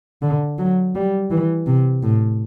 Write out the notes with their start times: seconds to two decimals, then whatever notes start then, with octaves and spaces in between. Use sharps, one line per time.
0.22 D3
0.58 F#3
0.95 G3
1.31 E3
1.67 C3
2.03 A2